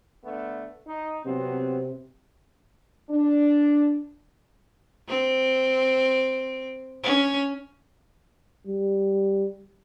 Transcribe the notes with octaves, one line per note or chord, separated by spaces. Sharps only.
D3 A3 B3
D#4
C3 F#3 B3 C4
D4
C4
C#4
G3